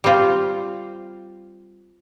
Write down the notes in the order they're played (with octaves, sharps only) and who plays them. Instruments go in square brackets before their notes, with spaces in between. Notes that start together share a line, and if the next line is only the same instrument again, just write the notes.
[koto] G3 C4 F4